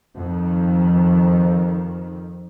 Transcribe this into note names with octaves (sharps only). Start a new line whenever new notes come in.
F2 D#3